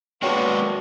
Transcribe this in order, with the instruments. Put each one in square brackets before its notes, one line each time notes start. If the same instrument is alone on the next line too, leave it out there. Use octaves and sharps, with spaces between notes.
[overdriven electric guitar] G#3 A#3 [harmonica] B3 C#6 [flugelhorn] D4 [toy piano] F#4 C#5 G5